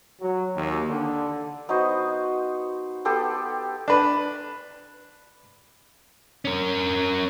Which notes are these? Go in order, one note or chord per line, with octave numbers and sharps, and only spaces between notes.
F#3
D#2
D3
B3 D#4 F#4 C5
B3 G4 A4 C6
D4 B4
C#4 A#4